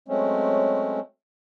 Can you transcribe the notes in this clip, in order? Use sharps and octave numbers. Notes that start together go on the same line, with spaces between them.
F#3 G#3 A3 C4 C#4